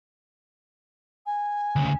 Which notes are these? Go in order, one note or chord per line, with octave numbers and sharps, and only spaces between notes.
G#5
D2 C#3